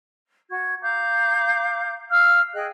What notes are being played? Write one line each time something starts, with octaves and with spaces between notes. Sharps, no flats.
F#4 G#6
F5 A#5 D6 G6
F5 E6 F6
G#4 D#5 G5 F#6